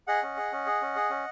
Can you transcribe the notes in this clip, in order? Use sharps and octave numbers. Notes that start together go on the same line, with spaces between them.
G#4 D#5 F#5
C#4
G#4
C#4
G#4
C#4
G#4
C#4